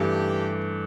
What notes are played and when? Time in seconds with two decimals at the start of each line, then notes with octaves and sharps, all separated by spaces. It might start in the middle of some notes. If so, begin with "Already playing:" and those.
Already playing: G2 E3 A3 G4